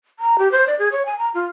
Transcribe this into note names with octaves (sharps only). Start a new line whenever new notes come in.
A#5
G4
C5
D5
G#4
C#5
G#5
A#5
F4